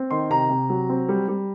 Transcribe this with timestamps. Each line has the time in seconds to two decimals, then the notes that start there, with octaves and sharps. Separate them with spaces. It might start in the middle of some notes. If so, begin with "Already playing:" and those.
Already playing: C4
0.11 D#3 C6
0.30 C3 A#5
0.49 C3
0.70 F#3
0.89 C4
1.09 G3
1.28 G3